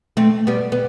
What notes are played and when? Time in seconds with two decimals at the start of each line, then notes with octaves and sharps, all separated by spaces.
0.17 A3 C4
0.47 G3 B3
0.72 B3